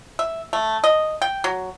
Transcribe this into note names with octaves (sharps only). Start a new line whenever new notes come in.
E5
A3
D#5
G5
F#3